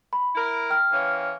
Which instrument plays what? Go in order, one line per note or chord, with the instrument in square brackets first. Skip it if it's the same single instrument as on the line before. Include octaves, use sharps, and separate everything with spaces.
[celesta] B5
[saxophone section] E4 A#4
[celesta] G5 F6
[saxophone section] E3 A#3 C#4